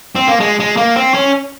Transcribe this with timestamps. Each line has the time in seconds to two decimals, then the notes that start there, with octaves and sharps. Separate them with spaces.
0.16 C4
0.28 A#3
0.40 G#3
0.60 G#3
0.77 A#3
0.96 C4
1.14 C#4